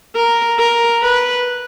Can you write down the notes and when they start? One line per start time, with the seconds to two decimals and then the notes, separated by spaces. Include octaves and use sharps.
0.15 A#4
0.59 A#4
1.02 B4